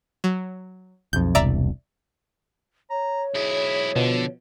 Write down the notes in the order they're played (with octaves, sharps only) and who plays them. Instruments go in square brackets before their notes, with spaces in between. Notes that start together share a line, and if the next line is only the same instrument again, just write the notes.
[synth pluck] F#3
[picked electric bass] B1 F2 [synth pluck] G6
[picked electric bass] E1 C2 [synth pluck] D5 E5 A#5
[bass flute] C#5 [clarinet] A#5
[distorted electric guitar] B1 E4 [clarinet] G#4
[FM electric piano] B2 F3 [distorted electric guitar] D3